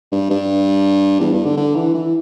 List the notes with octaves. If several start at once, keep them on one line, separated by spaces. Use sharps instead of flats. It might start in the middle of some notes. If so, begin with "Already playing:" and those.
G2
G2
E2
G2
D3
D3
E3
E3